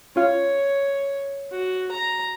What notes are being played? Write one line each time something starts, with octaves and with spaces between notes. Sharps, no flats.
C#4 F4 C#5 F5
F#4
A#5